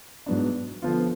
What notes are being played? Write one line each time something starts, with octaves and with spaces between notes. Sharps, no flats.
G#2 F#3 B3 D4
D3 F3 B3 F4